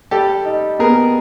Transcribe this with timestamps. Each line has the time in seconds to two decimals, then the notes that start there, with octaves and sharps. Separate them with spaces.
0.11 G3 G4 A4
0.45 D#4
0.79 B3 G#4 A#4